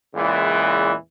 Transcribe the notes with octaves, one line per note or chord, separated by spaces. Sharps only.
E2 A#2 C#3 E3 G#3